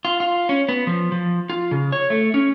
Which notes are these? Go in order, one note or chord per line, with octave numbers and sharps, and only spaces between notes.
F4
F4
C#4
B3
F3
F3
F4
C#3
C#5
A3
C#4